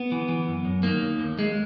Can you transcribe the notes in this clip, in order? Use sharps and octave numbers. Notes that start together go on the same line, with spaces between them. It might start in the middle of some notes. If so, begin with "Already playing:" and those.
Already playing: B3
E3
E3
F#2
F#2
D#3 A#3
D#2
D#2
D#2 G#3